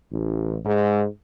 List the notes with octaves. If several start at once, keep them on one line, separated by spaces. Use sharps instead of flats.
A1
G#2